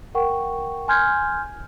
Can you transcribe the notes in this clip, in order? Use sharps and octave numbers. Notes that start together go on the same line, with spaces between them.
A#4 F#5 G5 C#6
G#5 C6 F6 G6 G#6